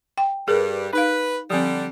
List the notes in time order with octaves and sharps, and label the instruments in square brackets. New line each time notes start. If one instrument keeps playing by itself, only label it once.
[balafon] G5
[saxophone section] G2 G3 [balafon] G#4 A#4 B4
[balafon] D#4 F5 [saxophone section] B4
[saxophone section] D3 G3 [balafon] F3 C4